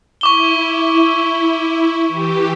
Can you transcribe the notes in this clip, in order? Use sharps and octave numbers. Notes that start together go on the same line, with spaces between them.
E4 C#6 D6 G7
E3 G4